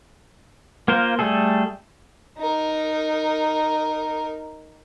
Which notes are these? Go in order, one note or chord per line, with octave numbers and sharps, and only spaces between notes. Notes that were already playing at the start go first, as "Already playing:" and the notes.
A#3 F4 A#4 C5
G3 A3 G#4 A4
D#4 A#4